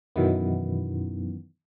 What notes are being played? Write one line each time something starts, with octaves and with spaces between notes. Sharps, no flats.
F#2 B2 D#3 E3 B3